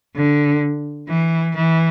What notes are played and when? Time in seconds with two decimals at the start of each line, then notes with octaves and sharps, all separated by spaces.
0.16 D3
1.09 E3
1.55 E3